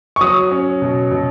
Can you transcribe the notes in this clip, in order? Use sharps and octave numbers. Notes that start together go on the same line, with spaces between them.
C#6
F#3 D#6
C#4
B2
B2